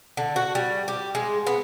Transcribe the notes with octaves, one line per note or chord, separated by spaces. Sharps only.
D3
F#4
G3
G4
G#3
B3